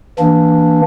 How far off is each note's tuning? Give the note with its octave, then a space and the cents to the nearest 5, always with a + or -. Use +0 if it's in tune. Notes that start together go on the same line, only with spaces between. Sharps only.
E3 +0 A#3 +0 D4 +0